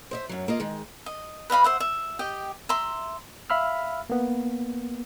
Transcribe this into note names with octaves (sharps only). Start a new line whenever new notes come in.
C5 D#5 E5
F#2 F#3
A#3 F4 D#5
D#3 G#3
D#5
B4 D#5 F5 B5
C5 E5 F#5
E5
G4 D#5 G5
E5 A#5 C6
E5 F5 B5 E6 F6
A#3 B3